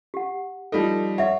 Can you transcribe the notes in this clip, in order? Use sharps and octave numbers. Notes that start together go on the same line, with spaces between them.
G4 F#5
F3 G3 D#4 A4
C#5 E5 F#5